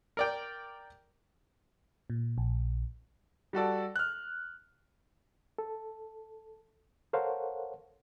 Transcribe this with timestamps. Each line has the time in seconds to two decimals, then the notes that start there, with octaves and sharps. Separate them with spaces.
0.17 A#4 D5 G5
2.10 A#2
2.38 A#1
3.53 G3 F#4 A4 D5
3.96 F6 F#6
5.58 A4
7.13 A4 A#4 C5 C#5 F5 F#5